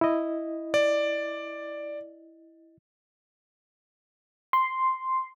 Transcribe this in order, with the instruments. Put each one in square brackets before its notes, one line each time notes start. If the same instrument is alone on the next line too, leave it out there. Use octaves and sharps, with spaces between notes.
[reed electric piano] E4 D#5
[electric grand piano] D5
[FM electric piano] C6